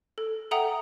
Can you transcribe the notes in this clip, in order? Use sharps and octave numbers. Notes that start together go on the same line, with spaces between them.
A4
A4 E5 F#5 G5 A#5 D#6